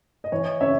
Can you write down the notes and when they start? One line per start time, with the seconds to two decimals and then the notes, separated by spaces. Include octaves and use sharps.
0.24 D#5
0.32 E3 C#5
0.61 C#3 C#5 E5